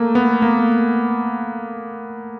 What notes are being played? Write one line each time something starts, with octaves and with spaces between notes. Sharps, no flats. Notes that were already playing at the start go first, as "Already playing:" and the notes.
Already playing: A3 A#3
B3
A#3